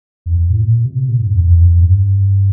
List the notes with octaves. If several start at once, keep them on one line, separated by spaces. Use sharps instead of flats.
F2
A2
A#2
C3
A#2
G2
F2
F2
F2
G2